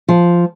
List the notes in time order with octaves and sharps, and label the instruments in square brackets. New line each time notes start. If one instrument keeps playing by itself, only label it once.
[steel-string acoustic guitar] F3